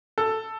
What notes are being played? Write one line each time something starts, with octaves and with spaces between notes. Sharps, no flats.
A4